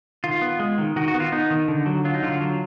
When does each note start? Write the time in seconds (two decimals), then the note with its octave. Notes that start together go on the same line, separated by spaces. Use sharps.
0.24 D#3 F4
0.41 B3
0.59 G#3
0.78 D#3
0.96 D#3 F#4
1.08 F#4
1.14 B3
1.20 F4
1.32 B3 D#4
1.50 D#3
1.68 D3
1.86 F#3
2.05 F#3 F4
2.14 D#4
2.23 D3 F4
2.41 F#3